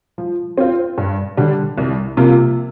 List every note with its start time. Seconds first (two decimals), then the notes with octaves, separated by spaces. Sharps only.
0.18 F3
0.58 C4 F4 C5
0.98 G2
1.37 D3 G3 D4
1.78 C2
2.17 C3 F3 A#3 F4